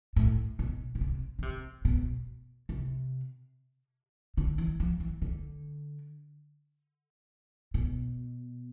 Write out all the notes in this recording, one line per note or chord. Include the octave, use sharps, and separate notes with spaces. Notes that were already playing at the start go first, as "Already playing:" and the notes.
A2
B2
B2
C3
D3
C3
B2
C3
D3
E3
F3
E3
D3
B2